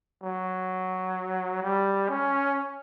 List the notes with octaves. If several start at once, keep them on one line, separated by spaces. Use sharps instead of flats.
F#3
G3
C#4